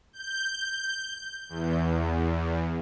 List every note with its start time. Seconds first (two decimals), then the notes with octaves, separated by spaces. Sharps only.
0.13 G6
1.49 E2